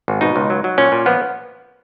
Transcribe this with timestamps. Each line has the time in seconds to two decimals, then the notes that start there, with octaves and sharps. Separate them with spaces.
0.08 G#1
0.21 B2 D#4
0.36 C#2
0.50 F#3
0.64 F#3
0.78 A#2 C#4
0.92 A#2
1.06 F3 B3